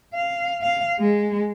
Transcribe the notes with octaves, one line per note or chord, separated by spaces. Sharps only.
F5
F5
G#3